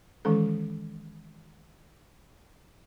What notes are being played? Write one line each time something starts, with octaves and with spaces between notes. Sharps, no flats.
D#3 E3 G#3 C#4 A4